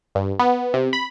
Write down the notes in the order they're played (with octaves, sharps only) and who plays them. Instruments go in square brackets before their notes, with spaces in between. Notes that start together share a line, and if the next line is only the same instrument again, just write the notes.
[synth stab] G2
B3
C3
B5